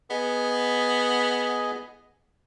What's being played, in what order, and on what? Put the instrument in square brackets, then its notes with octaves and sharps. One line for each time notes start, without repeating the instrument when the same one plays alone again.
[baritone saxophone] B3 [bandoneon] G#4 D#5